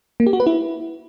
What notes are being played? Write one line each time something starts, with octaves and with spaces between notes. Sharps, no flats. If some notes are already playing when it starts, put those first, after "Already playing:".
A#3
G4
F#4
B4
E4